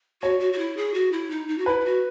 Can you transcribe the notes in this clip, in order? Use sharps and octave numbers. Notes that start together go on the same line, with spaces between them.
F#4 C#5
F#4
F#4
E4
G#4
F#4
E4
D#4
D#4
F#4
E4 B4
E4
F#4